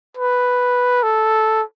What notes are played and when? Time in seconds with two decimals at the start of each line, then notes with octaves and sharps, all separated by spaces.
0.17 B4
1.03 A4